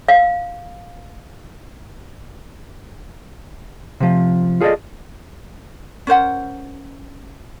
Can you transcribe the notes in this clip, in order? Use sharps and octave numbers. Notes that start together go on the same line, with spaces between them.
F5
C3 F3
F4 G#4 A4 B4 D5 D#5
C#4 A#4 C5 F#5